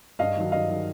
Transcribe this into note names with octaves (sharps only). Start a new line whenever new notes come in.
G2 D#5 F5
D#3 F#3
G2 D#5 F5
D#3 F#3